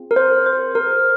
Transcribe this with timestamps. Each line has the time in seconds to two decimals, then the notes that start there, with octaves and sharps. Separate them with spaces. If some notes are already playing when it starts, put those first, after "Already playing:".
Already playing: C4 F4 G#4
0.11 A#4
0.16 C5
0.46 C5
0.75 A#4